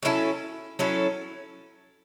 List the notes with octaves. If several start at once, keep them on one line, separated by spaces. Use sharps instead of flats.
F#3 C#4 E4 A4
F#3 C#4 E4 A4